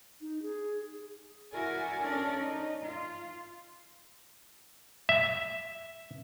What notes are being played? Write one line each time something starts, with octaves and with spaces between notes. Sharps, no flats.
D#4
G#4
E4 F#4 A#4 D5 G#5
C#4 D4 A4 A#4 C#5 D5
D#4
F4
E5